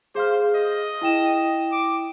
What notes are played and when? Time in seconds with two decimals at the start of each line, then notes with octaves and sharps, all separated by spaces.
0.15 G#4 C5 F5 F6
0.55 D#5
1.01 E4 G5 E7
1.72 D6